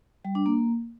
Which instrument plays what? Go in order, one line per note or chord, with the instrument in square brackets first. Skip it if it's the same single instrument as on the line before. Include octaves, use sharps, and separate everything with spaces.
[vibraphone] G3
D4
A#3